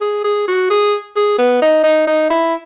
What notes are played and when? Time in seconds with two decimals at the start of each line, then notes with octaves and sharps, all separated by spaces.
0.01 G#4
0.24 G#4
0.48 F#4
0.70 G#4
1.16 G#4
1.38 B3
1.62 D#4
1.84 D#4
2.07 D#4
2.30 E4